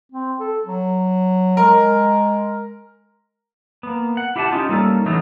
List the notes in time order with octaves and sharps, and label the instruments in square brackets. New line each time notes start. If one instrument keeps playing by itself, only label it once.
[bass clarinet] C4
A4
F#3
[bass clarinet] G#3 [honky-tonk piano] A#4
[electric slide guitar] A#3 B3
F#5
E4 G4 E5 F#5 G#5 A5
C#4 D#4 F4 G4
G3 A3 A#3 C#4 D#4 A4
E3 F#3 A3 C#4 D#4 E4